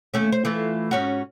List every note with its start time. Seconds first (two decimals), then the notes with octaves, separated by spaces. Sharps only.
0.14 D#2 A3 C#4
0.32 C5
0.45 E3 A3 F4
0.91 G#2 C#4 F#4